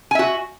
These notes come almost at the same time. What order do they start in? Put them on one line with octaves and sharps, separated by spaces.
G#5 E5 F#4